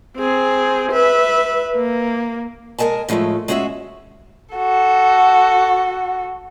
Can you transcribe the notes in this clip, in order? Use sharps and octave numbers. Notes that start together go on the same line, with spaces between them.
C4 G#4
B4 E5
A#3
G#3 A#4 D#5 G#5 A5
A2 F3 F#3 G#3 A3
G#3 C#4 F#4 G#4 C5 E5
F#4 A4